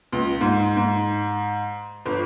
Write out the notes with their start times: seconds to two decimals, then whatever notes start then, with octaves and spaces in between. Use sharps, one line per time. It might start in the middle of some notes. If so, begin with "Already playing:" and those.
0.12 C#2
0.41 G#2
0.77 G#2
2.06 G1